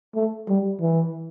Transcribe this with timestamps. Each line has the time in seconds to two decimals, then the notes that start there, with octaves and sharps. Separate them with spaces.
0.15 A3
0.49 G3
0.81 E3